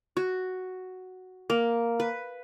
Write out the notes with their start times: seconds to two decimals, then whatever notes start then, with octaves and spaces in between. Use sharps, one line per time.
0.17 F#4
1.50 A#3
2.00 B4